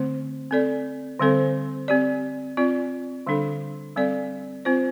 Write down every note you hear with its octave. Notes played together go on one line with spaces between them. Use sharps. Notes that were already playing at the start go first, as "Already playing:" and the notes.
Already playing: D3 A3 C4 C5
C4 A4 D5
D3 G3 C4 A4 C5
C4 G4 D5
C4 F4 D5
D3 G3 D4 A4
G3 C4 A4 D5
C4 F4 C5